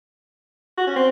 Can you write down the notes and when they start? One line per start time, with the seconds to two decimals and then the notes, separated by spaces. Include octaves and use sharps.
0.78 F#4
0.87 C#4
0.96 C4